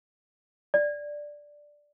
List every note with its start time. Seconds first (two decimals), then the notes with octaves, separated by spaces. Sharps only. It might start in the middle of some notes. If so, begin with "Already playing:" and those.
0.74 D5